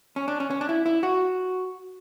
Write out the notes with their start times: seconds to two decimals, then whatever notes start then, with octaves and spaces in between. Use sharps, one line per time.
0.16 C#4
0.28 D4
0.40 C#4
0.51 C#4
0.61 D4
0.69 E4
0.86 E4
1.03 F#4